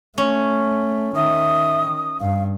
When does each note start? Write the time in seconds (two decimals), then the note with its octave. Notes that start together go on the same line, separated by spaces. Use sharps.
0.18 A3 C#4
1.15 D#3 E5 D#6
2.21 G2 F5